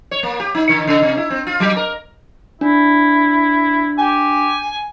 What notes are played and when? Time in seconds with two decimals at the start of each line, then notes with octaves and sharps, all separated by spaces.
0.11 C#5
0.23 A#3
0.40 G4
0.55 D#4
0.69 D3
0.87 C#3
1.03 C3
1.17 E4
1.30 C4
1.47 F4
1.60 F#3
1.77 A#4
2.61 D4 E4
3.98 G4 G#5